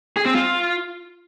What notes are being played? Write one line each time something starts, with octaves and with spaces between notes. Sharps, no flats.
G#4
C4
F4